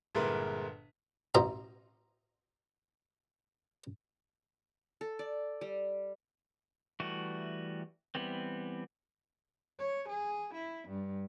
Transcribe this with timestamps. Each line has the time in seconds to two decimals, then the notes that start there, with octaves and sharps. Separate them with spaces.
0.15 G1 A#2 G#3 E4 A#4 B4
1.35 A1 B2 C5 E5 A#5
5.01 A4
5.19 D5
5.61 G3
7.00 E3 G3 A3 F#4
8.15 E3 G3 B3 C4
9.79 C#5
10.09 G#4
10.54 E4
10.89 G2